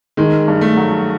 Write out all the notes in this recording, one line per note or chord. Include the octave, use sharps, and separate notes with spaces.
D#3 G#3
G2
A3
F#3